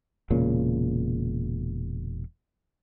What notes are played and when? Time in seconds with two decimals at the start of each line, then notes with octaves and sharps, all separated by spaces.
0.30 E1 A#2 C#3